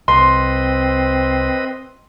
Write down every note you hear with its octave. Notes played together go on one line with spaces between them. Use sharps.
C2 C4 B4 D#5 C6